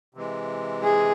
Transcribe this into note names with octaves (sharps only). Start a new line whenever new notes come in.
C3 E3 G#3
G#4